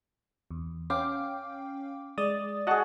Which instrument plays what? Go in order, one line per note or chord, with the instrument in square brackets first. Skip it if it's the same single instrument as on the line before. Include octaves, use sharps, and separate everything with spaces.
[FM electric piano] E2
[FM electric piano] C#4 F5 G5 [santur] D6
[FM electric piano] G#3 D5 A6 [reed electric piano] D#6
[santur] F#4 G#4 [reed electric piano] D#5 F#5 A5